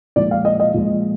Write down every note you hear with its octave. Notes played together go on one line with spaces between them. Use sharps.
A#2 F3 G#3 D5
F5
D#5
D#5
A#2 F3 G#3